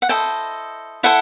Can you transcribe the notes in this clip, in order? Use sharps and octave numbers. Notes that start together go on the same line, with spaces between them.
F#5
E4 A4 C5 D#5 G5
E4 A4 C5 F#5